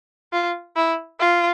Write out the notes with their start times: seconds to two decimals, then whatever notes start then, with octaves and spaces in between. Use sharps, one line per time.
0.33 F4
0.76 E4
1.20 F4